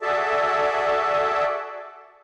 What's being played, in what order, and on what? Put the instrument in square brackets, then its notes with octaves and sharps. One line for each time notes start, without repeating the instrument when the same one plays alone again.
[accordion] F#4 G#4 A4 D5 E5 A5